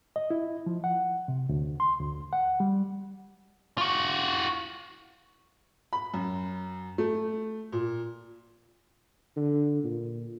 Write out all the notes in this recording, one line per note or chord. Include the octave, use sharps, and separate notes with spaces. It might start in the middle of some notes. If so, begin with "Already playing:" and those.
D#5
E4
F3
F#5
C3
D2
C6
D2
F#5
G3
F4 F#4
B5
F#2
A3
A#2
D3
A#2